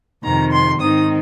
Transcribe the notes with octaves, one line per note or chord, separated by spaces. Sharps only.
F2 C3 D#3 A#5
C6
G#2 D#3 C4 D#4 D#6